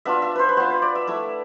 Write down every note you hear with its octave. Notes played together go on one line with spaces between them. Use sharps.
B3 D4 F4 E5
E5
B4 C5
B4
B3 F4 C5
B4
D5
E5
A3 E4 E5